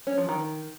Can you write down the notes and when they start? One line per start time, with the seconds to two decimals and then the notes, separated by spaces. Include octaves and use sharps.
0.07 C#4
0.18 F3
0.29 D#3